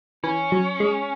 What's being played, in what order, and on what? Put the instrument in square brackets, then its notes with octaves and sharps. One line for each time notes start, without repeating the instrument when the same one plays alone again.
[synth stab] E3 [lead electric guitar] C#4
[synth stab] F#3
G#3